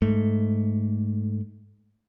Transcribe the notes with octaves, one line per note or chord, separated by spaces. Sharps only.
G#2 A3